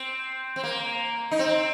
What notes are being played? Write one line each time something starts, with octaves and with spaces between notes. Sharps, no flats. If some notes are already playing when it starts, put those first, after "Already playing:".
Already playing: C4
C4
A#3
D#4
C4